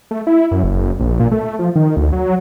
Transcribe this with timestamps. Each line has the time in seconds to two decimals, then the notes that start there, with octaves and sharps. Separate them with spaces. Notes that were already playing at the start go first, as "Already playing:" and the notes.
0.11 A3
0.27 E4
0.51 F#2
0.63 F#1
0.99 A#1
1.20 A#2
1.32 A3
1.45 A3
1.59 F3
1.76 D#3
1.97 D2
2.12 F#3